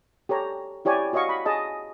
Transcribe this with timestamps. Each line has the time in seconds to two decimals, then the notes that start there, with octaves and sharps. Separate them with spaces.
0.29 G4 A4 C#5 A#5
0.85 E4 G4 C#5 D5 G#5
1.13 F#4 C#5 D#5 F5 C#6
1.29 B5
1.46 G#4 D#5 A5